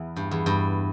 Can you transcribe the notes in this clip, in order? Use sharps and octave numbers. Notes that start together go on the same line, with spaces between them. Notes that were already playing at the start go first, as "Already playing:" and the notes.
Already playing: E2
G2
E2
G2